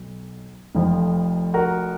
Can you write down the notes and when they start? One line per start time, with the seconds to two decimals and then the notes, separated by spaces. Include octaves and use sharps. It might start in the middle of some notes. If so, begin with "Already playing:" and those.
Already playing: B1 B2 F#3
0.75 F1 F2 F3
1.54 F#4 A#4